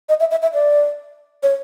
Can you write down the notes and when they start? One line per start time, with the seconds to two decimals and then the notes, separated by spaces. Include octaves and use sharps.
0.09 D#5
0.20 E5
0.31 E5
0.42 E5
0.53 D5
1.43 C#5